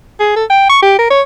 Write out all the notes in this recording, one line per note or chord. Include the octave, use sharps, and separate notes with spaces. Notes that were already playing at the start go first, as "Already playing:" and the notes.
G#4
A4
G5
C#6
G4
A#4
C#5